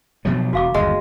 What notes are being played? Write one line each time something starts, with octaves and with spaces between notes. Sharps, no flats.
B2 F3 F#3
E1 F#4 F5 D6
G1 D#2 G#3